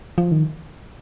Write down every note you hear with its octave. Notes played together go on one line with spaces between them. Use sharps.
F3
D#3